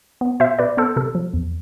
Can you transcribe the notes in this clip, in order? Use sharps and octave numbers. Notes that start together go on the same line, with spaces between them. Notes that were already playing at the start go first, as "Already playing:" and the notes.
B3
B2 C5 E5
B2 B4 D5
B3 A4 C5
C3 A4
F3
E2